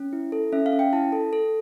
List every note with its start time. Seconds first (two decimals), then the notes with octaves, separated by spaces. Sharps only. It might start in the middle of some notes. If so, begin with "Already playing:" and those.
Already playing: C#4
0.13 E4
0.32 A4
0.52 C#4 E5
0.66 F5
0.73 C#4
0.79 G5
0.93 E4 A5
1.12 A4
1.33 A4